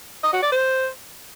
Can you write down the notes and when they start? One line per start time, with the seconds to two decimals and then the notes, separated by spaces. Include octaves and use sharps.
0.24 D#5
0.33 F#4
0.43 D5
0.52 C5